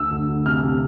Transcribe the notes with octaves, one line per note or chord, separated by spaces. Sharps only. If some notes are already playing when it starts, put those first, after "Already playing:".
Already playing: D2 E6
D2
D2
C3 F6
C3